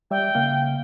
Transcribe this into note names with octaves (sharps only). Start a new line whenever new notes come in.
G3 D5 E5 G5
C#3 A#3 F5